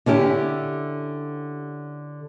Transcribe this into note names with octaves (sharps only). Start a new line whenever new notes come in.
D3 C#4 E4 G4